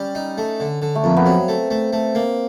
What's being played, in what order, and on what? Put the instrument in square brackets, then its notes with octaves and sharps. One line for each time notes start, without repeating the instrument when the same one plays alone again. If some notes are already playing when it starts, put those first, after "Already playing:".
Already playing: [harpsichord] G3 [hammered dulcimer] C#4
[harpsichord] D#4
A3
D3
D3
[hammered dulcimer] A3
[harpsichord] F2 [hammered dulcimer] A#3
[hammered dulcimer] B3
[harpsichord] F#3 [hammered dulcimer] C4
[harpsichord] A3
A3
A3
A#3